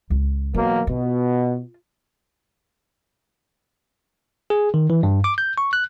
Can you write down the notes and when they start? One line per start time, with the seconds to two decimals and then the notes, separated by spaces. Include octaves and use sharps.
0.10 C#2
0.54 B2 E3 F#3 A#3
0.87 B2 F4
4.50 G#4
4.74 D#3
4.90 E3
5.03 G2
5.24 D6
5.38 G6
5.58 C#6
5.73 F#6